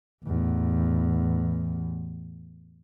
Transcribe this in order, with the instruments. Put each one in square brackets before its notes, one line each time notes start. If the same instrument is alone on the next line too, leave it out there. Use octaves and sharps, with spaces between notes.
[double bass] A1 E2